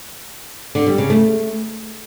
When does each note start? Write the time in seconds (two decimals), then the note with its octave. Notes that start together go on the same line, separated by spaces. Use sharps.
0.75 D3
0.87 G3
0.98 C#3
1.10 A3